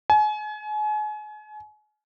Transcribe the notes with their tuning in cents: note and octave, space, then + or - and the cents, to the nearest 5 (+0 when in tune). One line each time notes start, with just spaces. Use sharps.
G#5 +35